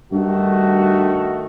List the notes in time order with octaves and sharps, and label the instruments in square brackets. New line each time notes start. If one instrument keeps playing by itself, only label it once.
[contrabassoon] G2 [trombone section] D#3 A3 F#4